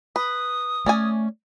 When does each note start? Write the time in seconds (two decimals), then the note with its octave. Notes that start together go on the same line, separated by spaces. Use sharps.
0.16 B4 D#6
0.86 A3 C#4 D5 G#5